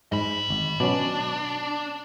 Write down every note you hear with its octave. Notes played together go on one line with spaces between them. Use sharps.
G#2 G#3 D#5 B5
G#1
B2 F#3 C#4 D4